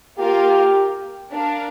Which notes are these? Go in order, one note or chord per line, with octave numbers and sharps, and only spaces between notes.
A#3 F4 G4 A#4 F5
D4 A#4 F5